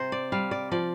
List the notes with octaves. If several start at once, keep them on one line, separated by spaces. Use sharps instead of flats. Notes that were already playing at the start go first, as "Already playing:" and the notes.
Already playing: C3 C5
D5
G3 F5
D5
F3 D5